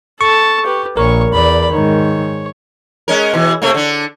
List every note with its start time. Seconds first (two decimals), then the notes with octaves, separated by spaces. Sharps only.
0.21 A4 A5 C#6
0.65 G4 B4
0.97 A#1 A#4 C#5 C#6
1.34 E2 D5 B5
1.72 G#2 D#3 C#5
3.08 G#3 C#4 A#4
3.34 B2 E3
3.62 C3 A3 A#3
3.74 D3 D4